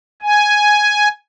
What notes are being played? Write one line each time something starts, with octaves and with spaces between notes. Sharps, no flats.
G#5